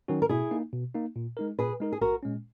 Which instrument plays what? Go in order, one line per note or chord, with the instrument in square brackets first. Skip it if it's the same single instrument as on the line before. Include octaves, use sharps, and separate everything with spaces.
[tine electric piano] D#3 F#3 C#4 F#4
[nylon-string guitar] A#4
[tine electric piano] B2 [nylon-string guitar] E4 G#4
[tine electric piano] A#3 D#4
B2
A#3 D#4
A#2
G#3 D#4 A#4
[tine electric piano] A#2 [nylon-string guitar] G#4 B4
[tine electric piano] G#3 D#4 A#4
[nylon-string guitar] G#4
[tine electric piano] A#1 [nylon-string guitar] F#4 A#4
[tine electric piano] A#2 G#3 C#4